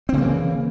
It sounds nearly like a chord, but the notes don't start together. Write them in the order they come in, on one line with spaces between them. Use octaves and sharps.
C4 C#3 A#3 E3